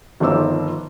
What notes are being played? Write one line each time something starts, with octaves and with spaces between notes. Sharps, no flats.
G1 D#3 F3 C4 D6 E6